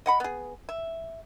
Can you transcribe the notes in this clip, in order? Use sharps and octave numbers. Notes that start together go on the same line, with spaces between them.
D#5 F#5 B5
B3 G#4
E5